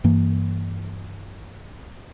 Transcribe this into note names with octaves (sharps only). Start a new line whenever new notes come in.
G2 E3 A#3